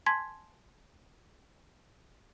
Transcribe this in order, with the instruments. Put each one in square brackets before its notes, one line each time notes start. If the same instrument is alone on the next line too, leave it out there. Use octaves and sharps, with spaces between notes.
[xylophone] G#5 A5 C6 G#6 B6